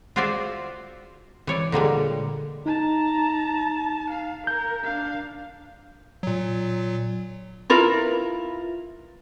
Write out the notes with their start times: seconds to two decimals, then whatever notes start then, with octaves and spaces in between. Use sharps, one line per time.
0.16 F4 F#4 G#4 C5 D5 E5
1.47 E3 C#5 D5
1.72 A#2 D3 G3 G#3
2.66 D#4 A5 A#5
4.11 F5
4.47 A#4 G6
4.83 D4 F5
6.23 A#2 F#3
7.70 E4 F4 A#4 B4